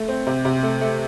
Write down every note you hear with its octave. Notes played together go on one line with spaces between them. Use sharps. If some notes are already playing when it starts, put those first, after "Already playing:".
Already playing: A3
C4
C3
C3
A3
A3